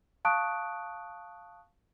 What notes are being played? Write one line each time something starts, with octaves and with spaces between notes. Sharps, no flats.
F5 A5 C#6 D#6 F#6 D7